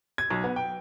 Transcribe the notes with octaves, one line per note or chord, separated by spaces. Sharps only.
G#6
B1
B3
G5